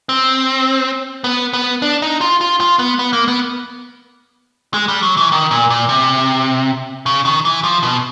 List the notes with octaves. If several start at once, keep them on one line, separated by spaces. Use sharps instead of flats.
C4
B3
B3
D4
D#4
F4
F4
F4
B3
B3
A#3
B3
G#3
G3
F#3
E3
D#3
A#2
A#2
C3
C#3
D#3
E3
F3
B2